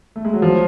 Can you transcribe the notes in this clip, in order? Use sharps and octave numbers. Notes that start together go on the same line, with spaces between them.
A3
G#3
F#3
F3